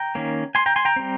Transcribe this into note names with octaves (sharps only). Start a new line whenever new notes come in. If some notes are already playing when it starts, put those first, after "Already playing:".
Already playing: G5 A#5
D#3 A#3 C#4
G#5 C6
G5 A#5
G#5 C6
G5 A#5
G3 C4